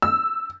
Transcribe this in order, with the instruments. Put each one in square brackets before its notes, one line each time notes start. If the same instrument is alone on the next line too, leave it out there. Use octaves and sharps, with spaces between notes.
[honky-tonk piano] E6